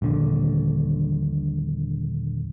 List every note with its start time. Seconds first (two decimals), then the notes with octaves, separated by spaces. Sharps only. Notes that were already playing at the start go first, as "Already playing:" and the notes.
0.02 D#1 A#1 D3